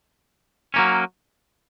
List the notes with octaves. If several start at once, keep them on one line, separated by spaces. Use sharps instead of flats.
F#3 A#3 C#4